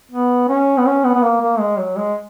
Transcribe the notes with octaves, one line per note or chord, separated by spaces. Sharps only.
B3
C#4
B3
C#4
B3
B3
A#3
A#3
G#3
F#3
G#3